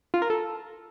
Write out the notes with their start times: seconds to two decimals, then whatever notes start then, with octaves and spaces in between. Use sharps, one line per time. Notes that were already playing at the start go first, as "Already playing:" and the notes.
0.14 F4
0.22 A#4
0.30 A4